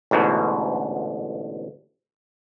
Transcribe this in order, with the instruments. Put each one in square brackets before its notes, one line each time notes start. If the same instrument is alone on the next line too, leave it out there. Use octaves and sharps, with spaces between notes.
[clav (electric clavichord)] A1 D2 G#2 B2